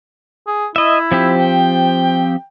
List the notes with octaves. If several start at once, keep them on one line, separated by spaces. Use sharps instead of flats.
G#4
E4 D#5 E5
F3 C4 G4
G5